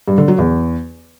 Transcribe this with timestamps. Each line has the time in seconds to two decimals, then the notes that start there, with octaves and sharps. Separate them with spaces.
0.08 G2
0.18 D3
0.28 F#3
0.38 E2